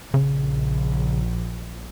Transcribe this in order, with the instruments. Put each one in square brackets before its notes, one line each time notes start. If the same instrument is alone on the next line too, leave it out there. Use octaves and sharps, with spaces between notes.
[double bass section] A#1 [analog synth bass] C#3